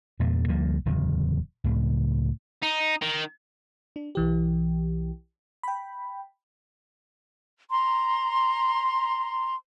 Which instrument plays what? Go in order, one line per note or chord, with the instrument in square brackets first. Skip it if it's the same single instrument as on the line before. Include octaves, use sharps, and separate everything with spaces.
[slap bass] E2 G2 A#2
D2 F3 G3 A#3
D1 E2 C#3 F#3
C#2 A2 C#3
[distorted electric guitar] D#4
D#3
[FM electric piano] D4
B1 E3 G4
G5 B5
[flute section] A#5 C6